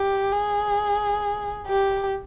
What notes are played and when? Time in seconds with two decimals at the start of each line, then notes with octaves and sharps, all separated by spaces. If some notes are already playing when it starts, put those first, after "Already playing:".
Already playing: G4
0.32 G#4
1.67 G4